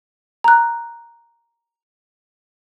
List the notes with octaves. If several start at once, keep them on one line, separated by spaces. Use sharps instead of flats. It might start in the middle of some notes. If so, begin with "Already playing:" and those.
A#5 F#6